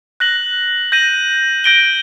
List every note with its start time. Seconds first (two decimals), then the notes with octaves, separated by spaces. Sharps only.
0.20 F#6 A#6 F#7
0.92 G6 A#6 D#7 F#7
1.64 G6 A#6 D7 G7